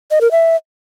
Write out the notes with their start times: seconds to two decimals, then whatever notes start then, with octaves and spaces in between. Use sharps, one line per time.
0.11 D#5
0.21 A#4
0.31 E5